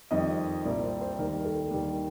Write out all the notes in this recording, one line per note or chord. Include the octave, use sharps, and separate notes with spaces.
F2 D#3 G3 D#5
C2 A#2 G3 D5
C5
C5
D#2 D#3 G3 A#4
A4
D#2 D#3 G3